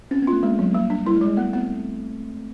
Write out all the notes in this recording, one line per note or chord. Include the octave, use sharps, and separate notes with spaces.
C4 C#4
B3 F4
A3
G#3 A#3
F#3
G3 A#3
D4
G3 E4
G#3
G3
G#3
A3 B3
B3 C4